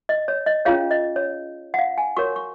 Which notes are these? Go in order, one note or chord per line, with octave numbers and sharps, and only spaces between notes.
D#5
C#5
D#5
C#4 F4 G#4 C#5 F5
D#5
C#5
F#5
F5
G#5
F#4 A#4 C#5 C#6
C#6